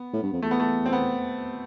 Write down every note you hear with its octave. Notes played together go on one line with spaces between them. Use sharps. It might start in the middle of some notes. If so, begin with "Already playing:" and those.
Already playing: B3
A2
G2
F2
E2 A3
B3
A3
C4
B3